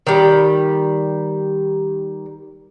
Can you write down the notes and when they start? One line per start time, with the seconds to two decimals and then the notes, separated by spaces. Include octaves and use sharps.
0.07 D#3 G3